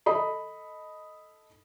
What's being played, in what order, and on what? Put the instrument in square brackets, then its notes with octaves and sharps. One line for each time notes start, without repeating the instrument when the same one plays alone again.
[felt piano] A4 D#5 B5 D#6